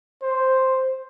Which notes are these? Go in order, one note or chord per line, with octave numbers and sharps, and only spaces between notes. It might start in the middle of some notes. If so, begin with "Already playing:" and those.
C5